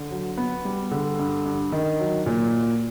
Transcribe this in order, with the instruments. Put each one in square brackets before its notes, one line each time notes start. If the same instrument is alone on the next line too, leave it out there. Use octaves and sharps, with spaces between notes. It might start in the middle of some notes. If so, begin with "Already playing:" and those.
Already playing: [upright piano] D3
F#3
B3
G3
D3
G2
G2
D#3
F#3
A#2